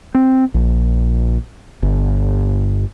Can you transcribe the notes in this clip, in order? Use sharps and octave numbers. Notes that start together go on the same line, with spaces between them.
C4
A#1
G1